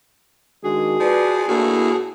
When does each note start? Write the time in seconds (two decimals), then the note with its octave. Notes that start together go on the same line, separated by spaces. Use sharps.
0.63 D#3 G#3 D4 F#4 G#4
1.00 F3 B4 D5
1.48 A2 A#3 D4 E4 F#4